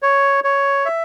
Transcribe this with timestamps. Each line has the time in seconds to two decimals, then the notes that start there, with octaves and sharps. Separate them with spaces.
0.02 C#5
0.44 C#5
0.85 E5